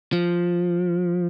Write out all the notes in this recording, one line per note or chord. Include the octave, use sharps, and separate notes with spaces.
F3